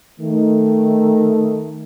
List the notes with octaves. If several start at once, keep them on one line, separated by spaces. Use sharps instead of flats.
D#3 A3